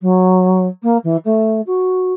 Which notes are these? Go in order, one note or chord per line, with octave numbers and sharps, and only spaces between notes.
F#3
A#3
E3
A3
F#4